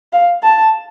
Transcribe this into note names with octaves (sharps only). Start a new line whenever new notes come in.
F5
A5